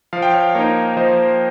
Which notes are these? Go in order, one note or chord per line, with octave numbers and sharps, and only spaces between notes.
F3 F5
G5
C#5 F5
A#3 D#4 A#4 C#5
F3 C5 D#5